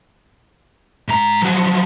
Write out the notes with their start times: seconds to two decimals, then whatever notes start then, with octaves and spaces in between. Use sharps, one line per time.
1.08 G#2 A#5
1.43 F3 F#3